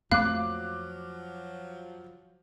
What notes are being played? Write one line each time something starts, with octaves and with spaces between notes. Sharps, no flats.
F2 F3 F#3 A3 A#3 F5 D6 F#6